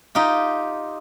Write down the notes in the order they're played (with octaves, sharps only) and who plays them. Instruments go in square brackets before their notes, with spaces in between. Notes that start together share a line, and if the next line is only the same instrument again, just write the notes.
[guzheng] D#4 F4 G4